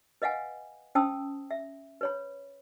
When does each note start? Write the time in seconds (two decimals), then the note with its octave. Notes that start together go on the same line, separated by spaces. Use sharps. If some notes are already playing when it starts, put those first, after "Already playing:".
0.22 B4 D#5 F5 F#5 G#5
0.95 C#4 C5 G5 A5 D#6 E6
1.51 E5
2.01 B4 C#5 B5